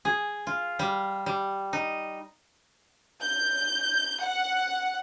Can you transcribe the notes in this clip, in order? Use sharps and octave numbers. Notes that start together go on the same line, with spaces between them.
G#4
F4
G3
G3
D#4
G6
F#5